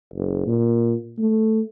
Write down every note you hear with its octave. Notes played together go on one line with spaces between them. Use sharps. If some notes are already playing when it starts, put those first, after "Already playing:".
F#1
A#2
A3